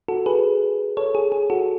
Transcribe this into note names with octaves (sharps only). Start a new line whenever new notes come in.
F#4 A4
G#4 B4
A4 C#5
G#4
G#4
F#4 A4